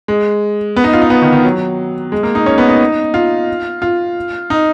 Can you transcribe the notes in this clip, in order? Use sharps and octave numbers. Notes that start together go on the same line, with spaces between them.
G#3
B3
D#4
F4
D#4
B3
D#3
D#3
F#3
G#3
A#3
D#4
C#4
B3
D#4
F4
F4
D#4